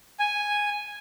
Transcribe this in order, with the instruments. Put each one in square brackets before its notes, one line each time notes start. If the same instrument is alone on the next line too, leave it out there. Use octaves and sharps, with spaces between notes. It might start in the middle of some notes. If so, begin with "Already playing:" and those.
[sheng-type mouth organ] G#5